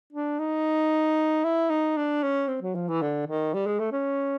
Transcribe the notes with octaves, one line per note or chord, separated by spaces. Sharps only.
D4
D#4
E4
D#4
D4
C#4
C4
F#3
F3
E3
D3
D#3
G3
G#3
A3
C#4